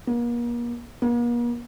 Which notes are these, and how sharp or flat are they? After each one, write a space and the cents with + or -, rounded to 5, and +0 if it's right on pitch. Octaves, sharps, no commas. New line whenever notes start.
A#3 +40
A#3 +45